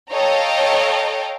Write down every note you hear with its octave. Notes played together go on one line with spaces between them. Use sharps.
A4 C#5 D#5 F5 G5 A#5